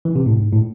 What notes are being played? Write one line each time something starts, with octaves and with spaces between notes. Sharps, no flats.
E3
C3
A2
G#2
A2